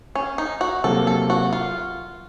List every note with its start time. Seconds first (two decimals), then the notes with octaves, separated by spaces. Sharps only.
0.15 C#4
0.38 D#4
0.61 F#4
0.84 C3 F#3 A#3 A4
1.07 A4
1.30 F#4
1.53 F4